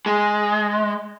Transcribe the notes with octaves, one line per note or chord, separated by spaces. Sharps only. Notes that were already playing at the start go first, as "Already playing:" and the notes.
G#3